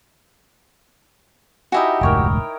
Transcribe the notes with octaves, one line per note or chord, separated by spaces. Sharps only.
D#4 E4 F#4 G4 E5 G#5
F1 D2 G#2 A#4 C#5 G5